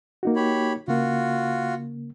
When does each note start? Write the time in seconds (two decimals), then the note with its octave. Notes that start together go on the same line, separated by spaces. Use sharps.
0.23 A#3 D#4 F#4
0.36 G4 C#5 B5
0.88 C#3 A#3 F4 F#4